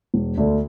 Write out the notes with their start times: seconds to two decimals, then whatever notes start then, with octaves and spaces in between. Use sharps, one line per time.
0.14 E1
0.38 D2 D3